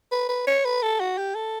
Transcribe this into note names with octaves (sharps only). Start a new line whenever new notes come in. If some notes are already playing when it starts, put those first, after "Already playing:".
B4
B4
C#5
B4
A4
F#4
G4
A4